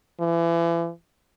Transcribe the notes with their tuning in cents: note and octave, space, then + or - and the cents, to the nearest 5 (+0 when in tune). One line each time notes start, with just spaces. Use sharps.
E3 +35